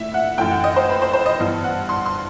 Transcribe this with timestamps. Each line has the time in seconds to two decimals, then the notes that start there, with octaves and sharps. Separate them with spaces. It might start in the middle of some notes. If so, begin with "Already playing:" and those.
Already playing: A2 E5
0.14 F#5
0.38 F#2 E3 A3 G5
0.50 F#5
0.64 D#5
0.76 C5
0.89 B4
1.02 C5
1.13 C5
1.26 D#5
1.39 G2 E3 B3
1.64 F#5
1.89 C6
2.06 C6